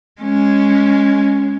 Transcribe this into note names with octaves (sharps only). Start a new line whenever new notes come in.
G#3 C#4